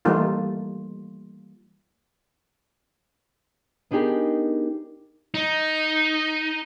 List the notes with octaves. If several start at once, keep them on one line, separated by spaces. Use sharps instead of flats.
E3 G3 A3 A#3 D#4 F4
B3 D4 D#4 G4 G#4 A#4
D#4